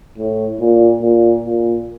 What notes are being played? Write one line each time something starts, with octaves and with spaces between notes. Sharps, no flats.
A2
A#2
A#2
A#2